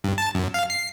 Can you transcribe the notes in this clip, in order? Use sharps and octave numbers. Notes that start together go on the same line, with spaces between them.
G2
A5
F#2
F5
C7